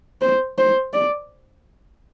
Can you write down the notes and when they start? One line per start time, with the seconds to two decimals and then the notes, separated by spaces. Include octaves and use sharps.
0.21 C5
0.58 C5
0.93 D5